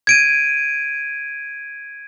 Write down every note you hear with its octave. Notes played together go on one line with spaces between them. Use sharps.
G#6 D7 D#7